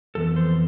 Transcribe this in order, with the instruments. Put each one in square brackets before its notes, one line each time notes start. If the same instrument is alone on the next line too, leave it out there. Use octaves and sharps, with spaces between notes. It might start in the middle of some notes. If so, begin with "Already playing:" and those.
[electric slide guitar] F2 E3 B3 A4
C5